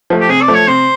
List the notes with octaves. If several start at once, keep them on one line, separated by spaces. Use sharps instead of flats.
F3 A3
G4
C3 G#4
D5
F3 A3
C#5
C3 C5